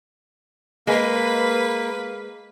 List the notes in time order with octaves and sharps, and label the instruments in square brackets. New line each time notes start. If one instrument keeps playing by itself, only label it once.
[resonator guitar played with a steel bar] G#3 [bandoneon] A#3 [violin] B4